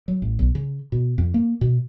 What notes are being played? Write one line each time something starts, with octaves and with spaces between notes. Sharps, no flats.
F#3
A1
B1
C#3
B2
F2
A#3
B2